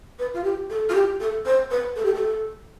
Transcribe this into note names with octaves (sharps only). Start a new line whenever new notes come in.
B4
F4
G4
A4
F4
G4
A4
C5
B4
A4
G4
A4